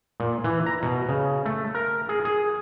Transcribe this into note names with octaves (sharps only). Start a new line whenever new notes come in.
A#2
E3
A#5
B2
C#3
A3
A#4
G#4
G#4